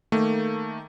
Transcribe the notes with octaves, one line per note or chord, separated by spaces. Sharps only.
D#3 A3 A#3